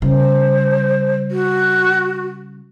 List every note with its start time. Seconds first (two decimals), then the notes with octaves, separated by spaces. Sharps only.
0.02 C#3 G3 C5
1.31 F#4